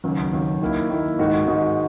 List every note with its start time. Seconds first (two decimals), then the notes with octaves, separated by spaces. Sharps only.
0.04 D#2 C#3 F#3
0.33 D#2 C#3 F#3
0.62 D#3 A#3 E4
0.90 D#3 A#3 E4
1.19 G#2 D#3 G#3 D#4 F#4
1.48 G#2 D#3 G#3 D#4 F#4